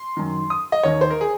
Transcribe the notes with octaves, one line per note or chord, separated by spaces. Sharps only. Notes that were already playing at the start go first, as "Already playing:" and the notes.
Already playing: C6
F#2 D#3
D#6
D#5
D#2 D#3 C#5
C5
A#4
G#4